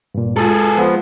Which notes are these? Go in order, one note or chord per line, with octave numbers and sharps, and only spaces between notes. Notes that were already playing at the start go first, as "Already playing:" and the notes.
G2 A#2
G#3 F4 G#4 A4
F3 B3